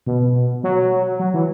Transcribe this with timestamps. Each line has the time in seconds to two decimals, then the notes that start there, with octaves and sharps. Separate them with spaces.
0.06 B2
0.63 F#3
1.19 F#3
1.34 E3